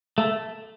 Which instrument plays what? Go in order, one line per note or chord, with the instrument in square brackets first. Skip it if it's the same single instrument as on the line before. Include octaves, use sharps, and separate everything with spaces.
[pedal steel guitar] A3